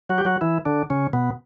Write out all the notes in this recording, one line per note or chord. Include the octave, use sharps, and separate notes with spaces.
F#3 F#4
G4
F#3 F#4
E3 E4
D3 D4
C#3 C#4
B2 B3